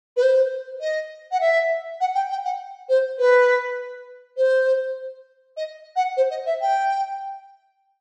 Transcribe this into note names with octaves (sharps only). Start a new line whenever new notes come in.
B4
C5
D#5
F#5
E5
F#5
G5
G5
F#5
C5
B4
C5
D#5
F#5
C5
D#5
E5
G5